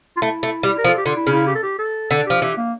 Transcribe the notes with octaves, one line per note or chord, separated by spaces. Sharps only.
F4
A3 E4
A3
G3
A#4
F3
A4
G4
D3 F4
E4
C#3
E4
G4
A4
G4
A4
D3 A4
F3 G4
E3 G4
A#3